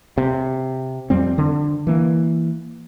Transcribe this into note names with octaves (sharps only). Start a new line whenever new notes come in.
C3
F2 G3 C4
D3
E3 A#3